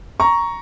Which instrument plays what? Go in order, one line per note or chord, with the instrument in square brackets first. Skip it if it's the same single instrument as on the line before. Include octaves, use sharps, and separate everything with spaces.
[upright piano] A#5 C#6